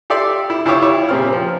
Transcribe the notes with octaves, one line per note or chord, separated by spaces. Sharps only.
G4 A4 D5 E5 C6
E4
D2 E4 F4 G4 C#5 D6
E4 C#5
A#2 C#3 C4 G4 F6
F3